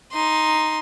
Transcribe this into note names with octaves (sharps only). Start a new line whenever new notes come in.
D#4 C6